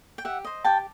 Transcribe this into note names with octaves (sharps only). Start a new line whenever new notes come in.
G5
G4 E5 F#5
C5 D#5
G4 G5 A5